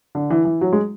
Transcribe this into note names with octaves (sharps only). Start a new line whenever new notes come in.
D3
E3
E3
F#3
G#3